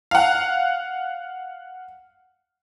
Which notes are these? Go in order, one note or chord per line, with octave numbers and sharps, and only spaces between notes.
F5 F#5